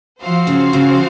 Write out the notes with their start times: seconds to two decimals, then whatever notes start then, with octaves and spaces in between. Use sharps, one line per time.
0.21 F3 C4 F#4 C5 F5
0.47 C#3
0.73 C#3